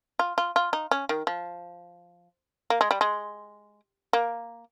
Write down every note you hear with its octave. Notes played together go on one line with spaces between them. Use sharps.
F4
F4
F4
D#4
C#4
D#3
F3
A#3
G#3
G3
G#3
A#3